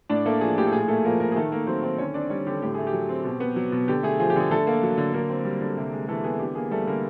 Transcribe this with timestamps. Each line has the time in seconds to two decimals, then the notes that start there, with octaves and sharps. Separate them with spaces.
0.09 A2 D4 D5
0.26 A3 A#3 A4
0.41 F3 G#4
0.58 A2 G4
0.67 A4
0.72 A#2 G#4
0.88 A3 A#3 A4
1.05 F3 A#3 A#4
1.20 A#2 A#3 A#4
1.32 G#4
1.36 D#3 A3 A4
1.51 A3 A#3 A#4
1.67 F#3 C4 C5
1.83 D#3 C4 C5
1.98 D3 C#4 C#5
2.14 C4 D4 D5
2.30 G3 C#4 C#5
2.46 D3 G4
2.62 A2 G4
2.74 A3 G#4
2.87 G4
2.93 F#3
3.09 C4
3.24 B2
3.40 B3
3.56 F#3
3.72 B2
3.88 D3 G4
4.03 A3 G#4
4.19 F3 G#4
4.30 G4
4.36 D3 G#4
4.50 D3 A3 A4
4.67 A#3
4.83 F#3
4.98 D3
5.13 D3 A#3 A#4
5.30 C4
5.45 G3
5.61 D3
5.78 C3
5.93 G#3
6.08 E3 A3 A4
6.24 B3 G#4
6.39 D3 G4
6.55 A#3 G#4
6.71 G3 A3 A4
6.87 D3 A#3 A#4